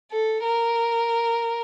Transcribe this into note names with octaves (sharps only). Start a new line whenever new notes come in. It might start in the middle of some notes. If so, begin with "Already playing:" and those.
A4
A#4